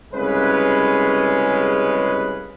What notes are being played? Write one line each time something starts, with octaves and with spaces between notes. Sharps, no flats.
C2 C#3 G#3 C#4 B4